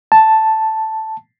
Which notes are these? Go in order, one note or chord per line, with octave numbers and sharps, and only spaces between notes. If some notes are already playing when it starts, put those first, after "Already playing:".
A5